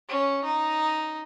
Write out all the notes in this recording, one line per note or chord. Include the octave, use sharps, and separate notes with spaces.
C#4
D#4